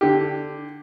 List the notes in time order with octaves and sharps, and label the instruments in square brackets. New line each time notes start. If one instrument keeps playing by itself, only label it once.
[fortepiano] D3 G4